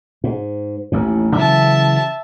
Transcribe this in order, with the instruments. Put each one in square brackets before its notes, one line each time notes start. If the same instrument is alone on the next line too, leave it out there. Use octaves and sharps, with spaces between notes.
[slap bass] G#2
A1 D#2 A2
[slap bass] C#3 E3 F#3 [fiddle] E5 A5